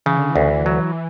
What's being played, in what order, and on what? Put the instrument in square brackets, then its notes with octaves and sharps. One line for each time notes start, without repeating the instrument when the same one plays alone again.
[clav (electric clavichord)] C#3 [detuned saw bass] E3
[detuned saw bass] D3
E3
[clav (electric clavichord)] D2
F#3